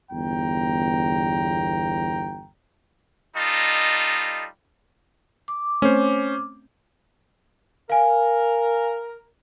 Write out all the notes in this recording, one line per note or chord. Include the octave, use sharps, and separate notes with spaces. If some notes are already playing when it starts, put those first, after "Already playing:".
G1 E2 G5 A#5
G3 D#4 F4 A4 D#5
D6
A3 C4 C#4 C5
A#4 F5 G#5